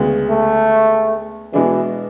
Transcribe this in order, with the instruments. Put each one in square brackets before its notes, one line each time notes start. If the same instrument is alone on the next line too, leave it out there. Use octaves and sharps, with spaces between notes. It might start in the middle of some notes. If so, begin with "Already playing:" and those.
Already playing: [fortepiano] D2 C#3 G#3 B3
[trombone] A3
[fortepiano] B2 G#3 D4 G#4 [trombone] E3